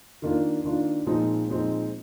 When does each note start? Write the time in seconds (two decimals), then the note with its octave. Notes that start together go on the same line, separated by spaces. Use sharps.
0.22 D#3 A#3 D4 F4
0.65 D#3 A#3 D4 F4
1.06 A#2 F3 G#3 C4 D#4
1.49 A#2 F3 G#3 C4 D#4